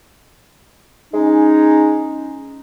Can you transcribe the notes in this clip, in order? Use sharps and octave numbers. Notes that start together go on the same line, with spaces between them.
G#3 C#4 D#4